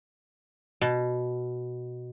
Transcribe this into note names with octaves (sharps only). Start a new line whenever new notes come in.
B2